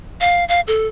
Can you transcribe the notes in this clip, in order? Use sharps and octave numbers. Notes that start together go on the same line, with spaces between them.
F5
F5
A4